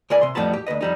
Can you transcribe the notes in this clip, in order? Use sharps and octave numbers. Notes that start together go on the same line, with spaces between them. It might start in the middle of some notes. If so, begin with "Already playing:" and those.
C#2 A#4 D5 G#5
C3 C6
F2 A2 G3 B3 A5 B5
G4
D2 G3 B4 D#5
F2 G3 D#4